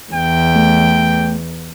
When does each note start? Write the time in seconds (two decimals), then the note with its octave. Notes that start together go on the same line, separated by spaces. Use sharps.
0.13 E2 G5
0.56 A3